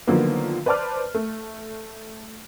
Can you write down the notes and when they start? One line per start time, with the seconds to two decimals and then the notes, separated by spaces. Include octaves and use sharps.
0.07 D3 D#3 F3 F#3 A#3 B3
0.66 B4 C5 D5 A5 D6 F6
1.14 A3